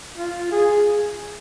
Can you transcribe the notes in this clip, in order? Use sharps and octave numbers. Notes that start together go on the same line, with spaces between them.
F4
G#4